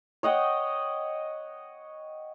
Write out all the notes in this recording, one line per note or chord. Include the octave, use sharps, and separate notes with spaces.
C#5 D#5 F#5 G5